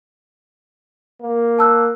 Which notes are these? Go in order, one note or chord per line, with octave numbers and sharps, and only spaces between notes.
A#3
A5 E6 F#6